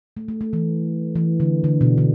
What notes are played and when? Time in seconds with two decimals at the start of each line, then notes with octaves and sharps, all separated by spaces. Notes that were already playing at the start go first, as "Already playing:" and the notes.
0.17 A3
0.28 A3
0.41 A3
0.53 E3
1.16 E3
1.40 D3
1.64 D3
1.81 B2
1.98 D3